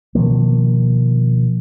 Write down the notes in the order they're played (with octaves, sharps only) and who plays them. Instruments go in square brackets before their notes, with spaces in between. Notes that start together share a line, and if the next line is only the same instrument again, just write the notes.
[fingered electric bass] B2 D#3 F3 A#3